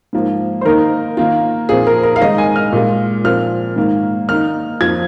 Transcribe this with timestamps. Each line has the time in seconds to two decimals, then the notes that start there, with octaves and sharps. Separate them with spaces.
0.13 G#2 F3 A#3
0.61 C5
0.65 D#3 A#3 D#4 A#4
1.17 D#3 A#3 F4
1.69 A#2 F3 C4 F4 G#4
1.87 A#4
2.03 A#4
2.16 F5
2.21 D#3 G#3 D#4 D#5
2.38 G#5
2.56 F6
2.72 A#2 G#3 F4
3.24 A#2 F3 C4 F4 F6
3.76 G#2 D#3 A#3
4.28 D#3 A#3 D#4 F6
4.80 F2 F3 A#3 F4 G#6